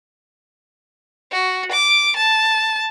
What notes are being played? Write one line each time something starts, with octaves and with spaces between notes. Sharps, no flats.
F#4
D6
A5